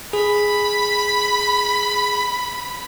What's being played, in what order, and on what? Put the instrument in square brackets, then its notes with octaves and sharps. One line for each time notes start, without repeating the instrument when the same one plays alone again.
[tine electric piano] G#4 [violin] B5